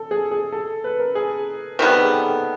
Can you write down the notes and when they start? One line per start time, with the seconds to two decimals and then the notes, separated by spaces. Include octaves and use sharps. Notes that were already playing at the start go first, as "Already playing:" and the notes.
Already playing: A4
0.11 G#4
0.31 G#4
0.52 A4
0.84 B4
1.00 A#4
1.15 G#4
1.79 C3 D#3 G3 B3 A#4
1.91 A4
2.03 G#4
2.14 A4